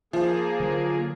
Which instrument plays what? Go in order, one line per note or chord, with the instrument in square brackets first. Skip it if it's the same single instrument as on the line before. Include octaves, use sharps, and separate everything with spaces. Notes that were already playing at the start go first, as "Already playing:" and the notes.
[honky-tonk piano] F3 [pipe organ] A#3 G#4
[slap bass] D3 F#3